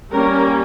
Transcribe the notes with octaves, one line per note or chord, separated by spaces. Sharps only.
G3 A#3 C#4 A#4